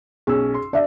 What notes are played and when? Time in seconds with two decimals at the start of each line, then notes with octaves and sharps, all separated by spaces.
0.27 B1 C#4 G#4 E6
0.54 C6
0.73 D4 D5 E5